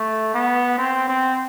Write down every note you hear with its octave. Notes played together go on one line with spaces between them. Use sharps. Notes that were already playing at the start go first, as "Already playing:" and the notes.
Already playing: A3
B3
C4
C4